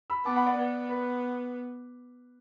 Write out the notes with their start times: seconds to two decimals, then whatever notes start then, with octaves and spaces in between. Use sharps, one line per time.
0.10 B5 E6
0.25 B3 A5 D6
0.36 F#5 B5
0.46 D5 F#5
0.58 B3
0.89 B4